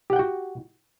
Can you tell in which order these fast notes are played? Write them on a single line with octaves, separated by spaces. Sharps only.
G4 F#5 G5 F#4